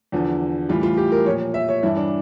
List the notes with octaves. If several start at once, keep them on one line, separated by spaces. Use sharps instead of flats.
E2 D3 F3
A2 E3 G3 F4
F4
G4
A#4
A#2 F3 C#5
E5
C#5
G2 E3 G3 E4
D4